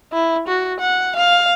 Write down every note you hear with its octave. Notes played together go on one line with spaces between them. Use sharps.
E4
F#4
F#5
F5